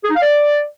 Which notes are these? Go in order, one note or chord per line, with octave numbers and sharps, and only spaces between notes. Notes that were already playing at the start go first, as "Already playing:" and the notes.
G#4
D#4
F5
D5